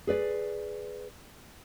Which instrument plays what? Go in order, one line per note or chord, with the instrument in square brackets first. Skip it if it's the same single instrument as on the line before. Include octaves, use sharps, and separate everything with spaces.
[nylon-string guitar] G#4 B4 D5